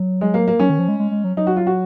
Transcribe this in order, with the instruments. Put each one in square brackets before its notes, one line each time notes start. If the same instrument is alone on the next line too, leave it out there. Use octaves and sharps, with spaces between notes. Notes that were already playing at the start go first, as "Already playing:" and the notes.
Already playing: [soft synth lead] F#3
[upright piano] G#3
A#3
A#3
[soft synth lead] F#3 [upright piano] C#4
[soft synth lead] D#3
F3
G#3
G#3
G#3
F#3
[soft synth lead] F#3 [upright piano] D#4
[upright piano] F#4
F4
F#4